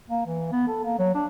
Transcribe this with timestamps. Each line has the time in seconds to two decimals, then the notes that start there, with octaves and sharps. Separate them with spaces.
0.10 A#3
0.26 E3
0.52 B3
0.68 A4
0.84 A#3
0.99 F#3
1.15 D4